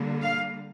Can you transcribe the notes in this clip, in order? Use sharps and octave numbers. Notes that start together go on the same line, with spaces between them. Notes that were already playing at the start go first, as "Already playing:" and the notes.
Already playing: D3 G3 A#3
F5